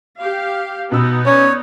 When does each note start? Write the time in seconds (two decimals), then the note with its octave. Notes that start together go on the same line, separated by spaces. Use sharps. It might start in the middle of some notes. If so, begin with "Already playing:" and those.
0.20 G4 F5
0.92 B2 B3 D#4 E6
1.26 C#4 C#5 D5